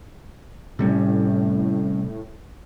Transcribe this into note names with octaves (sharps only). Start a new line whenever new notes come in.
A2 C3 G3 C#4